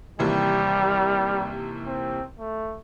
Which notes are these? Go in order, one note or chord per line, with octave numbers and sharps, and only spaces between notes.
D#2 C3 E3 G3
C4
A3